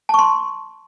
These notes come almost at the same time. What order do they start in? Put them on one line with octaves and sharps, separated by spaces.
A5 C#6 C6